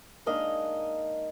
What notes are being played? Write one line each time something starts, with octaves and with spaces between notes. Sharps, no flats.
G#3 A#3 D4 D#4 D#5 F5